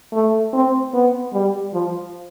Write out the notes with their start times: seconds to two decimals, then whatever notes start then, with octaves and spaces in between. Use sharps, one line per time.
0.13 A3
0.53 C4
0.94 B3
1.33 G3
1.74 F3